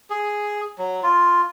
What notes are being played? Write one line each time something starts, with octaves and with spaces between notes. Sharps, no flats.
G#4
F#3
F4